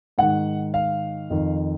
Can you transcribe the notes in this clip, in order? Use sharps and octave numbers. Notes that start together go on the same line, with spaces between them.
G#2 D#3 F#5
F5
F2 D#3